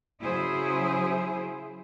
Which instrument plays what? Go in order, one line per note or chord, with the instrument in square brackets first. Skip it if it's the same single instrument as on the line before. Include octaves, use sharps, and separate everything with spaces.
[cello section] C#3 F#3 E4 G#4 C5